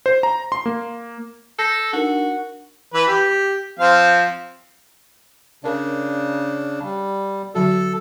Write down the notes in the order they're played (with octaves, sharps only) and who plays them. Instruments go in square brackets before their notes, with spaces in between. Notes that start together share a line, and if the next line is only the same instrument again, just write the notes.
[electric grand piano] C5
A#5
C6
A#3
[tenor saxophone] A4 [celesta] G6 A#6 C7
[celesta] D4 D#4 A#4 [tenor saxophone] F#4
[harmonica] E3 B4
G4
F3 C4 F5
[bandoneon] C#3 D4 [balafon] A#4 D5
[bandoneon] G3
[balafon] D3 F#3 F#4 [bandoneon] A4